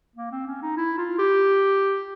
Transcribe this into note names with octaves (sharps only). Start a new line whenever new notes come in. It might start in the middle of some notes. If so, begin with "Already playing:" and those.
A#3
C4
C#4
D#4
E4
F4
G4